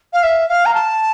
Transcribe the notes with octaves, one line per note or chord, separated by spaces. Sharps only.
F5
E5
F5
A#5
A5